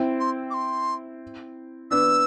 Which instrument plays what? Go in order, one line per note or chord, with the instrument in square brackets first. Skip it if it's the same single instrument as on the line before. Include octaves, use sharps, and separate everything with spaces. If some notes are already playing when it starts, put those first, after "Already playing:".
Already playing: [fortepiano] C4 E4
[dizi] C6
D6
C6
[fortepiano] B3 D4 [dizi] E6